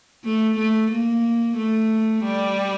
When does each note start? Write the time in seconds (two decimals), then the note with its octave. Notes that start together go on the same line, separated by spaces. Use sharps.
0.25 A3
0.58 A3
0.91 A#3
1.57 A3
2.24 G3